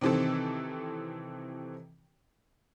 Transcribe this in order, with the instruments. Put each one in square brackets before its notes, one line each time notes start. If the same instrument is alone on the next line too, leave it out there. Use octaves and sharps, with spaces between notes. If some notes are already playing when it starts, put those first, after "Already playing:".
[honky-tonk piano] C3 D#3 E3 C4 A4